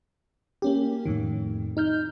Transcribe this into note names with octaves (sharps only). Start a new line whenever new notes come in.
A#3 C#4 G4
F2 A2 D#3
D#4 F6 G6